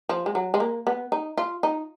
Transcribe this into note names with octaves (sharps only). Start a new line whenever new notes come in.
F3
G#3
F#3
G#3
A#3
B3
D#4
F4
D#4